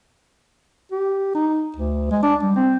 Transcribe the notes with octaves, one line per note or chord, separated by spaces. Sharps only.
G4
D#4
D2
G#3
D4
G3
C4